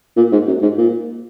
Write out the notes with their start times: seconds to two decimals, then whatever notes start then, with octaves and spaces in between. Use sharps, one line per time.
0.17 A#2
0.32 G#2
0.47 F#2
0.62 G#2
0.78 A#2